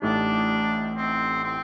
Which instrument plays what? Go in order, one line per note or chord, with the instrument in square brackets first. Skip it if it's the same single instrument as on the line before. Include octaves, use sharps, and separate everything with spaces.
[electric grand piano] A1 A2 A3 D#4 G4 [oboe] D4
[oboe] C4
C4